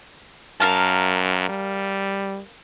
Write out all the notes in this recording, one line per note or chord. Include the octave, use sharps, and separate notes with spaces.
F#2 A#4 F5 A5
G3